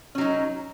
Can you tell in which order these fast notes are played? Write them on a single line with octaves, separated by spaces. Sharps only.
C#4 F#3 D#4